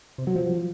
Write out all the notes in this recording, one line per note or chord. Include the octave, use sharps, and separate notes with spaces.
C3
F#3
F3